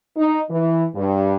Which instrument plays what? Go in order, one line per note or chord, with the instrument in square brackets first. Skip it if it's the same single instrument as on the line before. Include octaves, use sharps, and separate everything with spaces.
[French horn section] D#4
E3
G2